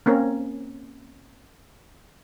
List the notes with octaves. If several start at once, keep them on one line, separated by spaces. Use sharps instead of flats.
A#3 C4 C#4 A#4